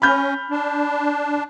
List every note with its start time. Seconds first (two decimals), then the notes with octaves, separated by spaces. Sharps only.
0.02 C#4 B5 F6 G6
0.50 D4